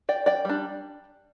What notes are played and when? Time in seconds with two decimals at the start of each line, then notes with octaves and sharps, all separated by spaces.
0.09 D5 G5
0.26 D5 G5
0.45 G3 D4